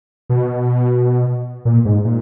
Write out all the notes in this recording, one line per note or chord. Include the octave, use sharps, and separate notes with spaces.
B2
A#2
G#2
A#2